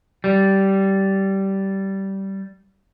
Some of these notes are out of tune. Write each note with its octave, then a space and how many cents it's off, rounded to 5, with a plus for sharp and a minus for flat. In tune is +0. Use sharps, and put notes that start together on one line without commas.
G3 -15